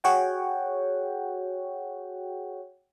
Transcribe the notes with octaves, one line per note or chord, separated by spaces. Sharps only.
F#4 G#4 C#5 F#5 G5